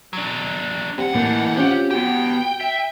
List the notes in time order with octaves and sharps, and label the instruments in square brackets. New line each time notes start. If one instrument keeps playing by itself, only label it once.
[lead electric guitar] F#3 D4
[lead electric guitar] D2 F#5 [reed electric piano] C4 G4
[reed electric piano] A2 A#3 [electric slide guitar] E3 D4 D#4
[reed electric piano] C4 C#4 F4 [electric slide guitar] G4
[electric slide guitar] B3 G4 [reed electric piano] F#4 [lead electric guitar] G5
[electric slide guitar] E5